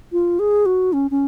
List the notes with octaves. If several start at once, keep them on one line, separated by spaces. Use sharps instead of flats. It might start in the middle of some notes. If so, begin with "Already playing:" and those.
F4
G#4
F#4
C#4
C#4